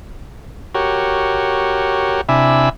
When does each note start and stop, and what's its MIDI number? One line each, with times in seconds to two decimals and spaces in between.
0.75 2.21 66
0.75 2.21 67
0.75 2.21 70
0.75 2.21 73
2.29 2.69 48
2.29 2.69 62
2.29 2.69 64
2.29 2.69 76
2.29 2.69 80
2.29 2.69 83